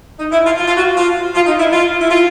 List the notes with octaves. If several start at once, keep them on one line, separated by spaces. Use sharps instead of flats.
D#4
E4
F4
F4
F4
F#4
F4
F4
D#4
E4
F4
E4
F4